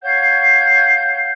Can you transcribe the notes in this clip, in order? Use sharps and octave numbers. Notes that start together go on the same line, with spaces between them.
C#5 F5 F#5 G6